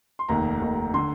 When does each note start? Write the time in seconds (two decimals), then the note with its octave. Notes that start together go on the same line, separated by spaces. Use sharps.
0.19 C6
0.29 F1 D#2 D#3 A#5
0.61 F1 D#2 D#3
0.94 D3 C6